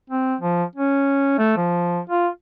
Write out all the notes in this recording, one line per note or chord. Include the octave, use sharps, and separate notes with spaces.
C4
F3
C#4
A3
F3
F4